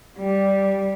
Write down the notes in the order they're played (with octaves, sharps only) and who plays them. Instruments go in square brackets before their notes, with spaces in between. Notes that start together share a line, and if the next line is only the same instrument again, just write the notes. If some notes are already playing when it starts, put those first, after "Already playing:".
[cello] G3 [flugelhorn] G4